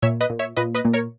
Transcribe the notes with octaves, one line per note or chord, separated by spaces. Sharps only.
A#2 C#5 E5
B4 D#5
A#2
C#5 E5
A#2 B4 D#5
B4 D#5
A#2
A#4 C#5